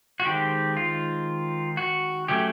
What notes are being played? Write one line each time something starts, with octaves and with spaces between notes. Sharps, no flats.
F#4
D#3 G#3 C4 G4
F4
F#4
F#3 A3 C#4 G4